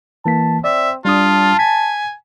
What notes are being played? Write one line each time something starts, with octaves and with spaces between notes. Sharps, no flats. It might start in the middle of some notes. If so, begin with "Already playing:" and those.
E3 A#3 A5 B6
C4 D5 E5
G3 D4 F4 A5 D#6
G#5 B6